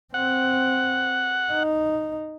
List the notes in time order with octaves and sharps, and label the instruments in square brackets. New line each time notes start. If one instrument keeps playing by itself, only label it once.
[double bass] C4 [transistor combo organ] F#5
[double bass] D#4